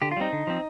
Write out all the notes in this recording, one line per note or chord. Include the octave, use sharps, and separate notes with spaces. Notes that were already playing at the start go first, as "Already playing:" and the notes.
D3 G4
F4
G3 C4 D#4
D3
F3 C4